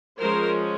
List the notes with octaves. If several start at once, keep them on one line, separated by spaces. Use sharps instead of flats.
F3 G#3 C#4 A#4 C5